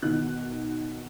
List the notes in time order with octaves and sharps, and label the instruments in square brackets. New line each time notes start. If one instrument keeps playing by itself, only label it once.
[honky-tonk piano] B2 D#3 F#6